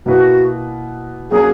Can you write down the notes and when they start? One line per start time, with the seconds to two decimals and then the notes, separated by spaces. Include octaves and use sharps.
0.06 B2 A#3 E4 F#4 B4
1.31 F#3 A#3 C#4 F#4 G#4 A#4